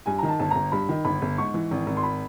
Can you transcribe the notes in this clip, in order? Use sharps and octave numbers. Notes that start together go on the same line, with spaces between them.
G2 G#5
A#5
D#3
A5
G1 A5
G1 A#5
G2 B5
D#3
G1 B5
G1
G#2 C#6
E3
G#1
G#1
C6
B5